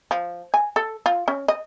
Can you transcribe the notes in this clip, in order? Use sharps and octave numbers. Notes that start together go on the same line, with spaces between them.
F3
G#5
A4
F4
C#4
D#5